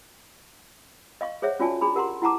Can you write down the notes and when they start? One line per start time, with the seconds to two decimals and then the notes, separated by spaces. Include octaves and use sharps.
1.21 D#5 F5 C#6
1.42 G#4 C5 C#5 E5 F#5
1.60 C#4 F4 F#4 D5 G#5 A5
1.81 D4 G#4 A#5 B5
1.95 G4 A#4 F#5 A#5 C6
2.22 E4 F#5 A5 A#5 D6